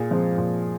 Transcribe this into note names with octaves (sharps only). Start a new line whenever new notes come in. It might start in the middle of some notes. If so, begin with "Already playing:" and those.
Already playing: A#2 G#4
F3 G#3 C4
A#2